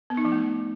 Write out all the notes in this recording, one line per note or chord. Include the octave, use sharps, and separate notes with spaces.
B3
D#4
F3
A3